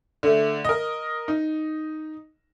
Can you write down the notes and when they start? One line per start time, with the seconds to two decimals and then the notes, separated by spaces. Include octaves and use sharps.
0.23 D3 A3
0.65 A#4 D#5
1.28 D#4